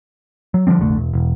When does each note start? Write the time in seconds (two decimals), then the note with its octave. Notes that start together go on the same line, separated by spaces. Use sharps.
0.54 F#3
0.67 D3 F3 G3 C4
0.79 F1 A#1 D3 A3
0.97 E1
1.13 E1